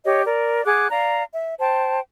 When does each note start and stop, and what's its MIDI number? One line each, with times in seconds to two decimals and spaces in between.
0.05 0.23 67
0.05 0.23 73
0.05 0.23 75
0.25 0.63 70
0.25 0.63 74
0.65 0.87 68
0.65 0.87 78
0.65 0.87 86
0.65 0.87 90
0.90 1.23 74
0.90 1.23 77
0.90 1.23 82
1.33 1.55 76
1.60 2.00 72
1.60 2.00 79
1.60 2.00 81